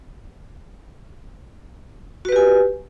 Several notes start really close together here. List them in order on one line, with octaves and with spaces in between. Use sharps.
F#4 B4 G4 G#5